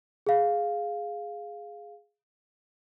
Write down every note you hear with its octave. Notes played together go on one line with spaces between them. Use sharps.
G#4 F5